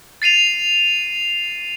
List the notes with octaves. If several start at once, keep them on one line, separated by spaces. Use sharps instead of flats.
A6 C7 D#7 F7